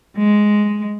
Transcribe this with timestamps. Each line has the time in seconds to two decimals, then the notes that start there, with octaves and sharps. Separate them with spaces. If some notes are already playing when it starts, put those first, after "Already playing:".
0.17 G#3